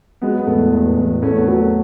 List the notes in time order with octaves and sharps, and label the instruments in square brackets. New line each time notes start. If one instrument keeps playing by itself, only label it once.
[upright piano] F#3 G#3 B3
B3
E2 A3
E2
E2
E2 A3 C#4
B3
F#3 A3 C#4